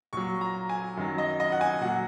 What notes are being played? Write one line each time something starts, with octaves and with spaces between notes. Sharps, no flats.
A#2 F#3 C#6
A#5
G#5
F#2 D#3 F#3
D#5
D#5
F#5
G#5
A#2 F#3 F#5